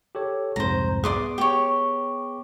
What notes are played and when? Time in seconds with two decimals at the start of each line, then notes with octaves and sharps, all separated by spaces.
0.15 G4 A4 C#5
0.56 C2 F2 G#2 C5 A#5
1.04 B3 G#4 D5 C6 D#6
1.38 G4 C#5